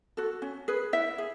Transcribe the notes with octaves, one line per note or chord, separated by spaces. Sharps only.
F#4 A4
C#4
G#4 B4
E4 E5
G#4